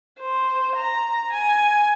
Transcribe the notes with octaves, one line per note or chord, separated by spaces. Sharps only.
C5
A#5
G#5